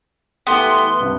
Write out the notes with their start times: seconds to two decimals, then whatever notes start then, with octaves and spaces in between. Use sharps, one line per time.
0.47 E3 A3 B3 G4 C6
1.00 C2 G2 C3